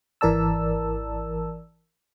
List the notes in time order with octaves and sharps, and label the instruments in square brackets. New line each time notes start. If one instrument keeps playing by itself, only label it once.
[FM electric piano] G#1 E3 A#4 D5 A5 E6